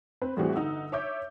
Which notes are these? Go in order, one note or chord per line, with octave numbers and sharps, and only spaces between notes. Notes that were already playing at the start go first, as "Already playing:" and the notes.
C4 B4
A2 E3 G3 C4 F#4 G#4
G1 D#4 F#5 E6
C#5 E5 D6 G6